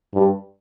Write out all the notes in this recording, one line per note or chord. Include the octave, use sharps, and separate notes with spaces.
G2